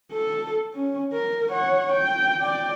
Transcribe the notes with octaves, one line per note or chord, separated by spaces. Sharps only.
A4
C#4
A#4
C#5 F#5
G5
D5 G5